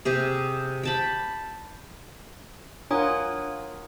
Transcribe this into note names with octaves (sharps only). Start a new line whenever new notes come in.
C3 G4 G#4
G5 A5 B5
D4 F4 A#4 C#5 F#5 G#5 D#6